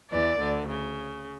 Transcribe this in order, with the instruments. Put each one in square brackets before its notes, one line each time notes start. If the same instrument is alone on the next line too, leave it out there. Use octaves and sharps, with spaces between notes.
[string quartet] E2 E3 [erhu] D5
[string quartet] D2 D3
C#3